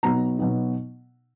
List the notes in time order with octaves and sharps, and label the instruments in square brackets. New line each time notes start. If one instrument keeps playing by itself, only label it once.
[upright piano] B2 F#3 B3 D#4 A#5
B2 F#3 B3 D#4